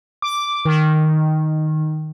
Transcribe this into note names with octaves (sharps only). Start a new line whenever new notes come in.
D6
D#3